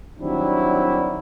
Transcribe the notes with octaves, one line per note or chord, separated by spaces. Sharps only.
D#3 F#3 G3 C4 D4 E4